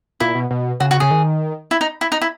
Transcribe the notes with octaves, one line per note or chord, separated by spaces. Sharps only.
A#2 E4
B2
B2
C#3 F#4
F#4
C#3 G#4
D#3
E4
D#4
E4
D#4
E4